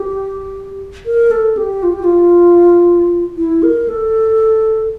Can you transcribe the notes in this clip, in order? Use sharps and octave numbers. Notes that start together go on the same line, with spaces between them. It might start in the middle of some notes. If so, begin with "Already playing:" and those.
Already playing: G4
A#4
A4
G4
F4
G4
F4
E4
A#4
A4